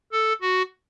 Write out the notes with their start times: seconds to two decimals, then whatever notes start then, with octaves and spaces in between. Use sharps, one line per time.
0.12 A4
0.41 F#4